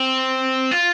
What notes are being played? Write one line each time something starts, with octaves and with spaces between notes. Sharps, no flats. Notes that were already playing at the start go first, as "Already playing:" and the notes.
Already playing: C4
F4